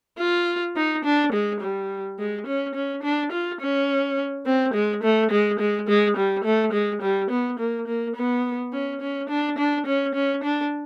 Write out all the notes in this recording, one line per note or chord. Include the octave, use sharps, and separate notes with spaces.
F4
D#4
D4
G#3
G3
G#3
C#4
C#4
D4
F4
C#4
C4
G#3
A3
G#3
G#3
G#3
G3
A3
G#3
G3
B3
A#3
A#3
B3
C#4
C#4
D4
D4
C#4
C#4
D4